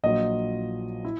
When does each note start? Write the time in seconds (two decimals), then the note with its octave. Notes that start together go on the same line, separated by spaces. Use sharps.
0.03 A#1 A#2 F#3 D#5
1.05 E4